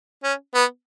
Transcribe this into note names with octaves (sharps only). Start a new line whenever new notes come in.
C#4
B3